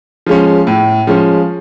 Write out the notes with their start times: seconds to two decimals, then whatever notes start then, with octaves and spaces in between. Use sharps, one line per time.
0.26 F3 G#3 C#4
0.67 A2
1.07 F3 G#3 C#4